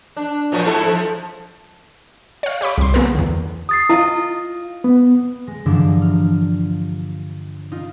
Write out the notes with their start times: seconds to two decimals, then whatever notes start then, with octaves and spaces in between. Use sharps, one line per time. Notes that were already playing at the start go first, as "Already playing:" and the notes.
0.17 D4
0.52 A#2 F3 F#3
0.66 G#2 E4 A4
0.86 F3
2.43 C#5 F5
2.61 G4 C#5 B5 D6
2.78 C2 C6
2.94 C#3 A#3 B3 G#4 A#4
3.15 E2 D3
3.69 D#6 A6 C7
3.89 E4 F4 D#5
4.84 B3
5.47 G#3
5.66 G2 D3 E3 F3 A#3 D4
6.02 F6
7.72 D#4 F4